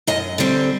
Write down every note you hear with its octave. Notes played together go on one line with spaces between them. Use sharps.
F#2 D#5
D3 G3 C4